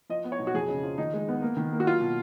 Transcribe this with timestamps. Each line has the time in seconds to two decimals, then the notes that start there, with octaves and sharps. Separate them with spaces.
0.09 F3 D#5
0.24 B3
0.32 C#5
0.39 B1
0.47 F#4
0.54 F2 G#4
0.69 C#3
0.83 F3
0.98 D#3 D#4
1.14 G#3
1.28 B3
1.42 A#3
1.57 D#3
1.73 A#3
1.80 F#4
1.87 F#3 F4
2.01 B2